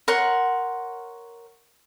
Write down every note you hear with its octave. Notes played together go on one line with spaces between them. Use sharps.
A#4 C#5 F#5 C6